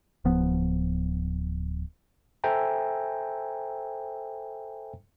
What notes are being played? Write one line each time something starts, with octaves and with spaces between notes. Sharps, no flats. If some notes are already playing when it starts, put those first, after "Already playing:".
D1 F3 B3
A4 C5 E5 G5 G#5 A#5